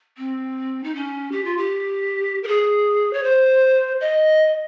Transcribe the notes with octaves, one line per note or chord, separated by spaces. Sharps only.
C4
D#4
C#4
G4
F4
G4
A#4
G#4
C#5
C5
D#5